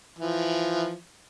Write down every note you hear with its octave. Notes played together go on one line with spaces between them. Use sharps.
E3 F3